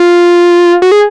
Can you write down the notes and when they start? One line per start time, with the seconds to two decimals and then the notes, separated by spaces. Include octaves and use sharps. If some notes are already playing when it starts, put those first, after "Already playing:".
Already playing: F4
0.82 F#4
0.92 G#4